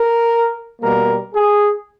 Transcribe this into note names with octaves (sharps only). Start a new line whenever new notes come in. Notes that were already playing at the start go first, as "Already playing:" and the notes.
Already playing: A#4
B2 G3 A#3 A#4
G#4